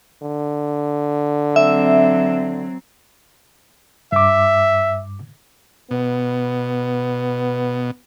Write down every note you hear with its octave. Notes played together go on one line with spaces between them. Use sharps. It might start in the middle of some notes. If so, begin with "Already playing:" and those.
D3
F#3 C4 E5
G2 E5 D6
B2 B3